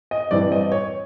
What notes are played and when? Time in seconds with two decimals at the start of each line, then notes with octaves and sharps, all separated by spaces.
0.11 D#5
0.31 G2 E3 G3 C4 D5
0.52 D#5
0.72 C#5